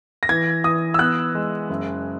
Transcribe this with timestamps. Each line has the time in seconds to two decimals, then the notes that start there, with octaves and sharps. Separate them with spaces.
0.23 A#6
0.29 E3 G#6
0.64 E3 D#6
0.94 E6
0.99 B3 F#6
1.35 G#3
1.70 F#1